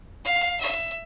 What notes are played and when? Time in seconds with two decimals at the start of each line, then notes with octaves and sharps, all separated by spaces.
0.24 F5
0.60 E5